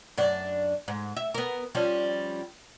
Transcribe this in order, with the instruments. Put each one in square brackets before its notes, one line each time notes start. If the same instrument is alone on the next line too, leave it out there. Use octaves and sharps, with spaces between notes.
[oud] F#2 D4
G#2
E5
B3 A#4
F3 G3 C#4